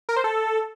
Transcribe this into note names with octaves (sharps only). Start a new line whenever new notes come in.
A#4
C5
A4